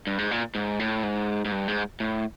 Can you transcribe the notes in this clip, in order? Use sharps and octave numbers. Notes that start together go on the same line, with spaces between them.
G2
G#2
A#2
G#2
A2
G#2
G#2
G2
G#2
A2